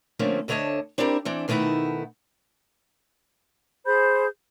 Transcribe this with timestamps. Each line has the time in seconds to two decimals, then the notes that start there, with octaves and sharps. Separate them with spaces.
0.19 D3 F3 A3 A#3 C4 C#4
0.48 D2 D3 A3 C#5 D#5 A5
0.98 C4 D4 E4 G4 A4 A#4
1.25 E3 C4 D4
1.48 B2 D#3 A3 D#4 E4 F#5
3.86 G#4 C5 B5 G6